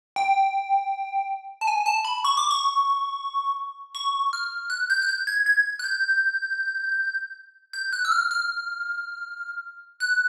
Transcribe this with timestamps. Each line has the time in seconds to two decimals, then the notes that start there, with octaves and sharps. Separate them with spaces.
0.16 G5
1.61 A5
1.67 G#5
1.86 A5
2.05 B5
2.24 C#6
2.37 D6
2.51 C#6
3.95 C#6
4.33 F6
4.70 F#6
4.90 G6
5.02 F#6
5.09 G6
5.27 G#6
5.46 G#6
5.79 F#6
5.84 G6
7.73 G6
7.93 F#6
8.05 E6
8.12 F6
8.31 F6
10.00 F#6